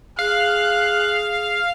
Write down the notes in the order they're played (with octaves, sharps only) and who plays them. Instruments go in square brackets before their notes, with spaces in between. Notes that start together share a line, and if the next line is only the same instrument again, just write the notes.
[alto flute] G#4 [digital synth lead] F5 [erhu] F#6